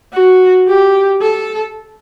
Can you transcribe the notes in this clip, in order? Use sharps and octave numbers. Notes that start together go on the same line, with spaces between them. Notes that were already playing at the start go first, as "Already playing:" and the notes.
F#4
G4
A4